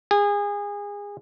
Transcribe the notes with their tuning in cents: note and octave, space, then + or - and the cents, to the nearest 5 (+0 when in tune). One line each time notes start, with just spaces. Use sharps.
G#4 -25